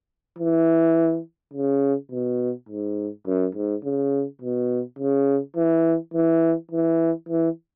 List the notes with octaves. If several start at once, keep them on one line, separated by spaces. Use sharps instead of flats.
E3
C#3
B2
G#2
F#2
G#2
C#3
B2
C#3
E3
E3
E3
E3